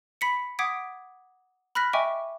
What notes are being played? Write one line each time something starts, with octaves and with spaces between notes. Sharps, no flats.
B5 B6 C#7
F#5 D6 D#6 G#6 B6 D7
B5 F6 F#6 A#6 B6
D#5 E5 G5 G#5 C#6 D6